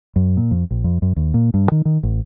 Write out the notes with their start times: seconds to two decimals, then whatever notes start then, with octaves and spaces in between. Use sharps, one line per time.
0.16 F#2
0.37 A#2
0.51 F2
0.71 A#1
0.84 F2
1.02 F#2
1.16 D#2
1.34 A#2
1.54 G2
1.72 D#3
1.85 D#3
2.03 A1